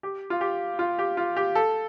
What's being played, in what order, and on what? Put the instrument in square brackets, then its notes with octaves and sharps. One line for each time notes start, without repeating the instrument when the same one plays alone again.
[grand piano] G4
F4
G4
F4
G4
F4
G4
A4